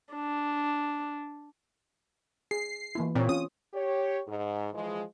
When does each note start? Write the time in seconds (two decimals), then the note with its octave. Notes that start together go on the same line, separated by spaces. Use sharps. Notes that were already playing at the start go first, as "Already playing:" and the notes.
0.13 D4
2.51 G#4 C7
2.95 E3 A#3 E4
3.15 A#2 C4 C#5
3.29 C#4 F4 D#6
3.74 G4 C#5
4.27 G#2
4.72 E3 F3 G#3